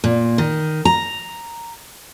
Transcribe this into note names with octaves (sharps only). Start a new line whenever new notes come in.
A#2
D#3
A#5